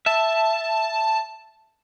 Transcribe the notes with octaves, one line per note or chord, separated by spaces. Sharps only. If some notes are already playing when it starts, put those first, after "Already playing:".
E5 A5